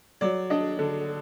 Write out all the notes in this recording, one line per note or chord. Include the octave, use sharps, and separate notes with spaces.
F#3 D5
D4 D#5
D3